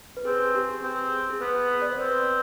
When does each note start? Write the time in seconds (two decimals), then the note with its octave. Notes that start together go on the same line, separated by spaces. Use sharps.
0.17 B4
0.25 C4 G#4
0.39 G#4
0.55 G4
0.69 G#4
0.83 C4
1.30 G#4
1.41 B3 B4
1.82 D5
1.90 C5
1.98 C4 B4